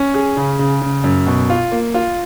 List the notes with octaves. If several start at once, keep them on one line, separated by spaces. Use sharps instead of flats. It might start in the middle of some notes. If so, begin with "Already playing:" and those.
Already playing: C#4
G#4
C#3
C#3
C#3
F#2
B2
F4
A#3
F4